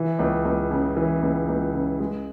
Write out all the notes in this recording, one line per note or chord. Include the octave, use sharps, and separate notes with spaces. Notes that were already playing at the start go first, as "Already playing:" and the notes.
Already playing: E3
C#2
C#2
C#3
E3
C#2
C#2
C#3
G#3